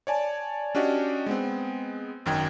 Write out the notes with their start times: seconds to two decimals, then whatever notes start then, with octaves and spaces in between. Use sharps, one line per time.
0.07 C#5 D5 G#5 A5
0.75 C#4 D4 F#4 G4 D#5
1.26 G#3 B3 C4
2.26 G#1 F#2 D#3 G5 G#6